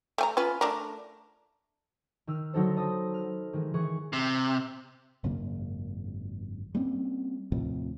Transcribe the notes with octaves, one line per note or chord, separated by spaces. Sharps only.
A3 G#5 A#5
C#4 F4 B4
A3 D4 A#4
D#3 E6 F6
D3 F#3 D#4 A4 C5
C5 D#5 A5 B5 D#6
F6
D#3 E3 G#3
D#3 E3 G#4 C#6
C3
G#1 F#2 C#3 A#3
G3 A#3 C4 C#4
D#2 A2 C3 F3